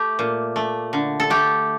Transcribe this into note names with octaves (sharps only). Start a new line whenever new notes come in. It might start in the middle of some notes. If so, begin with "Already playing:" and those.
Already playing: A3 G4
A#2
A3
D3
A4
A3 G4